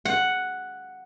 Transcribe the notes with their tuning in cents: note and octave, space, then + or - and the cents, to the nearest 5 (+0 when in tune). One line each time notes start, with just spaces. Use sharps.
F#5 +0